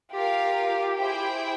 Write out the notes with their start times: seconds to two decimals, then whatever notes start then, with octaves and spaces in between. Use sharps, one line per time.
0.11 F4 G4 A#4 F5
0.98 E4 G#4 C5 G5